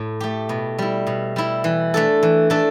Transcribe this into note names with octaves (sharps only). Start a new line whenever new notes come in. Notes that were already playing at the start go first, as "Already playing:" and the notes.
Already playing: A2
A3 G4
B2
G3 E4
B2
G3 E4
E3
A3 D4 A4
E3
A3 D4 A4